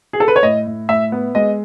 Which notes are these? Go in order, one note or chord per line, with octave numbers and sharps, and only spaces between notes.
G#4
A4
B4
C#5
A2 D#5
A2
A2 E5
B3
G#3 D#5